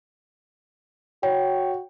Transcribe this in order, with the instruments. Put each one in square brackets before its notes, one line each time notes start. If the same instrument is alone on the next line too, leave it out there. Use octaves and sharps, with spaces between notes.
[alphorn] F#4 [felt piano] C#5 [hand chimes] G5